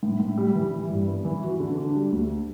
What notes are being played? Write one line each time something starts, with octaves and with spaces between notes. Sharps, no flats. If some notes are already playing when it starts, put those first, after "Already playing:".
A2
A2
G3
E3
E4
G2
B3
E3
F#4
D3
D4
G3
D2